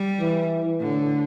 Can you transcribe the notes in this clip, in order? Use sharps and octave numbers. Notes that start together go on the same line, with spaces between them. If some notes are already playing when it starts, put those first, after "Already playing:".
Already playing: G3
E3
A2 D3